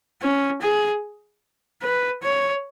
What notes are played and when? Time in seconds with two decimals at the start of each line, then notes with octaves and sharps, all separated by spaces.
0.22 C#4
0.62 G#4
1.82 B4
2.23 C#5